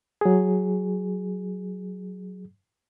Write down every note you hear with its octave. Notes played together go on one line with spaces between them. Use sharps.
F#3 G#4